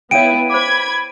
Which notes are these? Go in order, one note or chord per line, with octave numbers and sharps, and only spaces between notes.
B3 E4 C#5 F5 G5 D7 D#7
C5 B5 D6 G#6